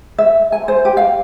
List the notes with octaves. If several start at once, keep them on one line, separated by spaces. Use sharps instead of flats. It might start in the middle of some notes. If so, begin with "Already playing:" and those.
E5
G#5
C5
G4
F5